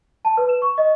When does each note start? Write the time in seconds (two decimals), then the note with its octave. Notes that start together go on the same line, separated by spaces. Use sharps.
0.25 A5
0.37 B4
0.49 E7
0.62 C#6
0.78 D#5